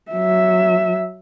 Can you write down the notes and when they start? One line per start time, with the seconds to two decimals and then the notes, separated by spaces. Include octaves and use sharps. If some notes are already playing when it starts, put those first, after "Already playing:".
0.11 F#3 E5